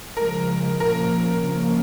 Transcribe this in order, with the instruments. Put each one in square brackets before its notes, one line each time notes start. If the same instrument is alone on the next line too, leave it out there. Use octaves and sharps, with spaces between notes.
[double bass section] C#3 F3 G#3 [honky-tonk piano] A#4
[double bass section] A#2 F3 A#3 C#4 [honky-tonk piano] A#4
[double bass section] C#3 F3 A#3 C#4